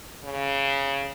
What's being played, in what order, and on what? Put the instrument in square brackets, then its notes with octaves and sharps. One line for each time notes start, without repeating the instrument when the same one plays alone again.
[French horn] C#3